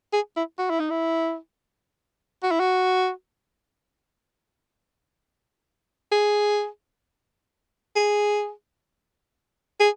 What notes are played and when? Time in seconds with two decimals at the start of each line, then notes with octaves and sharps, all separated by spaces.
0.13 G#4
0.36 E4
0.59 F#4
0.70 E4
0.80 D#4
0.90 E4
2.43 F#4
2.51 E4
2.60 F#4
6.12 G#4
7.96 G#4
9.80 G#4